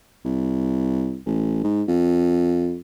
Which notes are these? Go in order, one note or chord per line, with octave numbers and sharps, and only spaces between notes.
C2
A1
G#2
F2